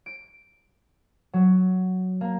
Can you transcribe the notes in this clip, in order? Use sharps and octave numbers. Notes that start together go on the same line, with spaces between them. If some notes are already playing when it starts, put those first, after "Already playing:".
D7
F#3
A#3